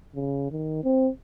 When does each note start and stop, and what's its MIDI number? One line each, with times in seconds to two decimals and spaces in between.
0.15 0.47 49
0.51 0.79 51
0.84 1.10 60